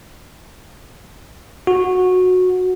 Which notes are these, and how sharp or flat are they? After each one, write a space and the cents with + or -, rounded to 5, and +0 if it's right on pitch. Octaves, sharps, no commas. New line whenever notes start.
F#4 -15